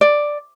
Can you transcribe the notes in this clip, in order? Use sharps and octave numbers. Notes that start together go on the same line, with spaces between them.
D5